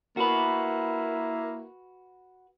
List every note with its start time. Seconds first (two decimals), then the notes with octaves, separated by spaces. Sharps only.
0.17 A#3 E4 F#4 B4